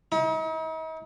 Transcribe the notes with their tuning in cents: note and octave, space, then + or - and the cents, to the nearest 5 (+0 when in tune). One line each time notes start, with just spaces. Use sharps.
D#4 +45